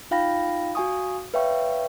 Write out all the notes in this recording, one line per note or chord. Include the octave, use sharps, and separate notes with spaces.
D#4 F4 F5 G5 B5 A#6
F#4 F5 G#5 C#6 D#6
B4 C#5 E5 F5 G5 C#6